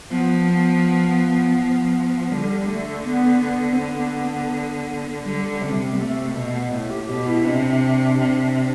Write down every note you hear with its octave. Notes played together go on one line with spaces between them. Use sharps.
F3 B3
B3
F3
D3 G3
A3
B3
B3
C4
B3
B3
B3
D3 G3
G3
C3 G3
G3
B3
C3 A3
A3
B2
B3
A2 A3
G4
B2 G4
E4
C3 D4
C3